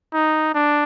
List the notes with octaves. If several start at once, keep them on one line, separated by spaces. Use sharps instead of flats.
D#4
D4